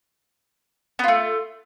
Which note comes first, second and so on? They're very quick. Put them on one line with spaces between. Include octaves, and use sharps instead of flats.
B3 F4 A3